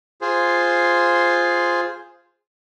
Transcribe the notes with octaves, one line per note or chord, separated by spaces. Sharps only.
F4 G#4 C5